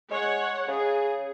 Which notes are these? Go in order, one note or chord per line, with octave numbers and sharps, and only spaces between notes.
G#3 C#5 F#5
C#3 G#4